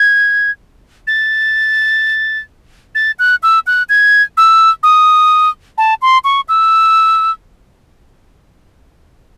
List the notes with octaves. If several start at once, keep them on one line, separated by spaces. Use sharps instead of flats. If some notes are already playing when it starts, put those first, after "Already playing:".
Already playing: G#6
A6
A6
F#6
E6
F#6
G#6
E6
D#6
A5
C6
C#6
E6